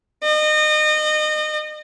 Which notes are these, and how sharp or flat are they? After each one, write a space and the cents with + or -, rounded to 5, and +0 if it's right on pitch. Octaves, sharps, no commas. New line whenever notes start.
D#5 -30